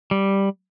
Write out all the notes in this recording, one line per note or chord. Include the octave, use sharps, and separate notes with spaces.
G3